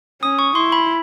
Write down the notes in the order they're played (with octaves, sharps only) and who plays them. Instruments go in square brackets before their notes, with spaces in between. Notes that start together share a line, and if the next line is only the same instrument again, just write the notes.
[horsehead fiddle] C#4 [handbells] D#6
[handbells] C#6
[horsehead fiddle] E4 [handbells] C6
[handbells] B5